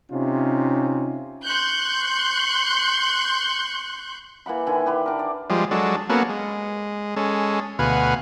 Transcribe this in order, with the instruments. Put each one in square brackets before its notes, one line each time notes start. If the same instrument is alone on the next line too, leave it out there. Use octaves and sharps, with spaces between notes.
[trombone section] C3 C#4 D#4 F4
[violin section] C6 C#6 F#6 G6
[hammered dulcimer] E3 A#3 F#5 B5
D3 D#3 E4 G#5
G4 B4 B5 C6
D4 A#4
D5
[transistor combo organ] F3 G3 G#3
F#3 G#3 D4 A4
A#3 B3 C#4 F#4 A4
G#3
G#3 C#4 A4
D2 B2 B4 F5 F#5 G#5